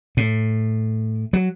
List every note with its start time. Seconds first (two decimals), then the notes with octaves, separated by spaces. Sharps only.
0.17 A2
1.33 F#3